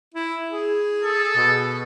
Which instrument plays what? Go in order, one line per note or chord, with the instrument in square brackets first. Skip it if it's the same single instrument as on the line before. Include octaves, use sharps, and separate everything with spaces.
[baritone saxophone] E4
G#4
[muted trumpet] A4
[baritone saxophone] B2